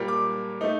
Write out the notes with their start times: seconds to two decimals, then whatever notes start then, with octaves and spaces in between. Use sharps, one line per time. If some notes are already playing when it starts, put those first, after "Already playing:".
Already playing: A#2 G3 A#3
0.08 D6
0.61 A3 D#4